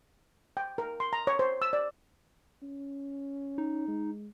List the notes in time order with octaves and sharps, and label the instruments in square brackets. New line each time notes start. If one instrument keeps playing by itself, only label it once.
[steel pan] G5
A#4
C6
A#5
C#5
C5
E6
D5
[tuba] C#4
[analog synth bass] D#4
[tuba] G#3